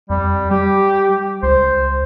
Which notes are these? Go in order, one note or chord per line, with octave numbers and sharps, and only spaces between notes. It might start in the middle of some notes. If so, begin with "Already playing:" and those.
F2 G3
G3 G4
C#2 C5